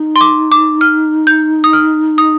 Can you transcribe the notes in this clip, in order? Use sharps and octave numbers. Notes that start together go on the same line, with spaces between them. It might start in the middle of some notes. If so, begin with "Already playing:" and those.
Already playing: D#4
C6
D6
D6
F6
G6
D#6
F6
D#6